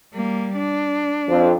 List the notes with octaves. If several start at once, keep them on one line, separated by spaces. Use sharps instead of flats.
G3 A#3
D4
F2